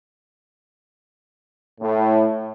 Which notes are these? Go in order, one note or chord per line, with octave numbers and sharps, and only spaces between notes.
A2